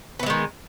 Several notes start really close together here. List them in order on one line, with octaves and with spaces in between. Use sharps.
B3 E3 G#3 D#3